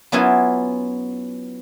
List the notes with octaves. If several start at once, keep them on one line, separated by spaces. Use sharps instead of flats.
F#3 B3 C#4 E4 F4 G#5